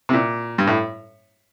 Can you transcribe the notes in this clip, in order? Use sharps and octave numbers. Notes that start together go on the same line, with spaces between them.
C3
A#2
G2
A2